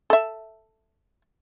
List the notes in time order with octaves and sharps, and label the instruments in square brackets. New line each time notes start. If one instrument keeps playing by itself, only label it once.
[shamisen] A4 E5